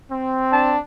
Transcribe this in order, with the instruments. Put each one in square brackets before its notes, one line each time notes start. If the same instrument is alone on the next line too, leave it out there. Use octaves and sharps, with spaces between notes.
[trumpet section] C4
[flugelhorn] D4 [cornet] A5